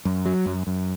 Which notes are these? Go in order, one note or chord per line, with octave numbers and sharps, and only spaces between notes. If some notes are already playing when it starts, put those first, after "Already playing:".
F#2
F#3
F#2
F#2